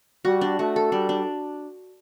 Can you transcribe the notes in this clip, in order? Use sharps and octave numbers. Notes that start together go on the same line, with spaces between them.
G3 F#4
D4
A3 F#4
A4
G3 D4
D4